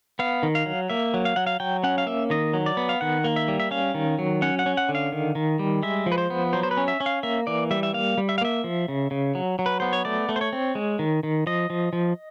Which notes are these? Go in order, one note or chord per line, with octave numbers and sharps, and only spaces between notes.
B3 F5
D#3
F5
F#3
A#3 E5
F#3
F5
F#3 F#5
F5
F#3 G5
C#4 F#5
F5
A#3 E5
D#3 D#5
F#3
D5
B3
F5
D#3 F#5
A#3
E5
G3
E5
C#4 F5
D#3
F#3
C#4 F#5
F#5
C#4
F#5
D3
F5
D#3
D#3
G3
G#3 E5
F3
B4
C5
B3
F#3 C5
C5
B4
C#4
E5
C#4
F5
A#3 E5
E3 D5
G3 E5
E5
A#3 F5
G3
E5
F5
A#3 E5
F3
C#3
C#3
F#3
F#3
B4
B3 C5
C#5
A3 D5
A3
C5
C#5
C4
G#3
D#3
D#3
F3 D#5
F3
F3